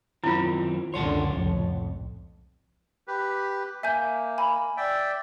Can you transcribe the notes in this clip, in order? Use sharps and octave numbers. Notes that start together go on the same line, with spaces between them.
F#2 D#3 C4 E4 F4
C#2 F#2 D3 C#5 F#5 A5 C6
C2 F2 A2
G4 B4
A#3 E5 G#5 G6
G#5 B5
D5 E5 G5